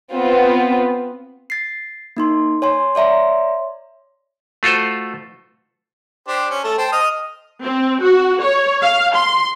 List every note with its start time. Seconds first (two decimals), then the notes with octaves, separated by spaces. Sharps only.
0.12 B3 C4 F4
1.50 A6 C7
2.17 A#3 D#4 C6
2.62 C#5 G#5 C6
2.95 C#5 D5 E5 A#5 C6
4.63 A3 F4 F#4 A4 C5
6.28 D4 G4 C5
6.50 C#4
6.64 A3 A4
6.78 C5 G5 A5
6.92 D#5 D#6 F6
7.64 C4
8.02 F#4
8.43 C#5
8.82 F5
9.16 C6